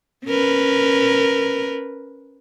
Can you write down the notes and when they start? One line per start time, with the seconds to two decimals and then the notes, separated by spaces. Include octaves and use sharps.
0.26 C#4 A#4 B4